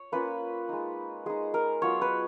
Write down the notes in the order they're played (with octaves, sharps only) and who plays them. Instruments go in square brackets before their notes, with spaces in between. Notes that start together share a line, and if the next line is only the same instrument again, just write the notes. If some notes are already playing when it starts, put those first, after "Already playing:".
Already playing: [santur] C#5
A#3 C#4 F4 B4
G#3 D#4
G#3 D#4 G#4
A#4
F#3 B3 F4 C#5
B4